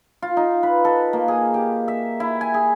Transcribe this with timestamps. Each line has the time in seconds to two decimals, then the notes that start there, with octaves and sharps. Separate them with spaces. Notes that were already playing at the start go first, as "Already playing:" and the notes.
0.22 F4
0.37 D#4
0.63 B4
0.85 A4
1.13 A#3
1.28 G#4
1.54 G4
1.88 E5
2.20 E4
2.41 G#5
2.54 G#4